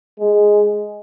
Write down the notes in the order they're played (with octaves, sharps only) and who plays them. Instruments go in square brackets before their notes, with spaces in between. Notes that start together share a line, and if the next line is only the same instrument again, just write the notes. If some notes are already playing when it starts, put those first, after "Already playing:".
[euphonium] G#3